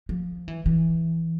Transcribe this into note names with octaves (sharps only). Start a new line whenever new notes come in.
F3
E3
E3